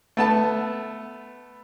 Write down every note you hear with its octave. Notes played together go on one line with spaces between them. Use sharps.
A3 B3 A5